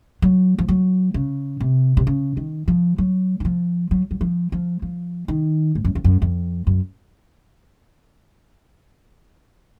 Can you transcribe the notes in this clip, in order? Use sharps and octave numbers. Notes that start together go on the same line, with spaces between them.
F#3
F3
F#3
C#3
C3
C3
C#3
D#3
F3
F#3
D#3
F3
F#3
F#3
F3
F3
F3
D#3
G#2
F#2
F2
F#2
F2
F#2